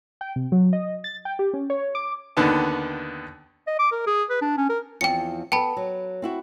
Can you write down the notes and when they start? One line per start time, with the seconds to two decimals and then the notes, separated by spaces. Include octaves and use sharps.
0.21 G5
0.36 C3
0.52 F#3
0.73 D#5
1.04 A6
1.25 G5
1.39 G4
1.54 C#4
1.70 C#5
1.95 D6
2.37 D#2 D3 D#3 B3 A5
3.67 D#5
3.79 D6
3.92 A#4
4.06 G#4
4.30 B4
4.41 D4
4.57 C#4
4.69 A#4
5.01 E2 F3 C4 G5 C#7
5.52 B3 A4 G5 A5 B5
5.77 F#3
6.22 C4 E4 F#4